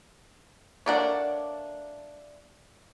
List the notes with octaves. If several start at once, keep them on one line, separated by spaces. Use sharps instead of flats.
A3 A#3 D4 C#5 D5 F#5